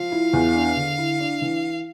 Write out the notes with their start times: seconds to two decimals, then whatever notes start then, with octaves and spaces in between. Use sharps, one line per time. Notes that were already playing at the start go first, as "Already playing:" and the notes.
Already playing: F3 F5
0.12 E4
0.33 E2
0.54 D4
0.76 D3
0.98 E4
1.20 D4
1.42 E3